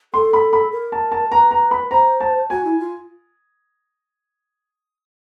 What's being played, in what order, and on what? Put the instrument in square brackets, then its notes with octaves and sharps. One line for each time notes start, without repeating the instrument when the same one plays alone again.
[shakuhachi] A4 [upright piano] C6
[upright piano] B5
B5
[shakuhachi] A#4
[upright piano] A5
A5
[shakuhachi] B4 [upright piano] A#5
[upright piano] A#5
B5
[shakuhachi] C5 [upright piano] A#5
[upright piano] A5
[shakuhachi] F#4 [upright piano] G#5
[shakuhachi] E4
F4